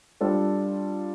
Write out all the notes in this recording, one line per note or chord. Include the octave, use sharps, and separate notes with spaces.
G3 D4 F4 A4